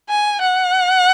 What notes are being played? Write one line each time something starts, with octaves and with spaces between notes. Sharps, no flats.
G#5
F#5